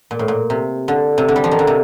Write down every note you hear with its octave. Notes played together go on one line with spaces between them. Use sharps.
A#2
A2
A#2
C3
D3
C3
D3
G3
F3
D#3
D3
C3